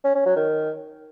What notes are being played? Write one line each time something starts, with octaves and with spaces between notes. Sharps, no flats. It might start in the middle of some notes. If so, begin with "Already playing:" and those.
C#4
C#4
F#3
D#3